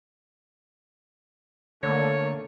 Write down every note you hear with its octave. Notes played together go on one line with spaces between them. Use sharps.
D3 A3 A#3 C#5